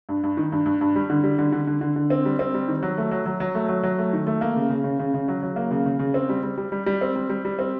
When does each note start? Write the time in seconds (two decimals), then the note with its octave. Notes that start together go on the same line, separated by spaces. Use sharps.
0.09 G2
0.24 G2
0.37 D#3
0.52 G2
0.66 G2
0.81 G2
0.96 G3
1.10 D3
1.24 G3
1.39 D3
1.52 D3
1.67 D3
1.81 D3
1.96 D3
2.10 C4
2.25 G3
2.39 C4
2.54 G3
2.68 D#3
2.83 F#3
2.98 A3
3.11 F#3
3.26 F#3
3.40 F#3
3.55 A3
3.69 F#3
3.83 F#3
3.99 A3
4.13 D#3
4.27 A3
4.41 A#3
4.56 C#3
4.70 C#3
4.84 C#3
4.99 C#3
5.14 C#3
5.28 F#3
5.43 F#3
5.56 A#3
5.71 C#3
5.86 C#3
5.99 C#3
6.14 C4
6.29 G3
6.43 G3
6.58 G3
6.72 G3
6.86 G3
7.01 C4
7.16 G3
7.30 G3
7.45 G3
7.59 C4